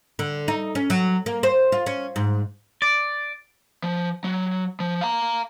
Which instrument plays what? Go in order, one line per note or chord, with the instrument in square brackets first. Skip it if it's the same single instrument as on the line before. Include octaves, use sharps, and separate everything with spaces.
[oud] D3
D#4
C#4
F#3
A#3
C5
F4
C#4
G#2
[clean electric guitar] D5
[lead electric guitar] F3
F#3
F3
F5 A#5